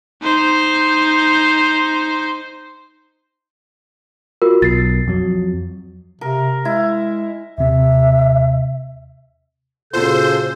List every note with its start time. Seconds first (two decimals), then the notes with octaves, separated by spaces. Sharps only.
0.23 D#4 C5
4.42 F4 F#4 A#4
4.62 B1 A6 C7
5.08 F2 F#3
6.21 C3 A#4
6.65 G#3 E4
7.58 D#2 C3 E5
9.93 A#2 C#3 F4 F#4 A4 C5 G6